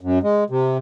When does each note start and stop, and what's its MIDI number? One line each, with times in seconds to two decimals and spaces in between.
0.01 0.19 42
0.23 0.44 56
0.50 0.77 48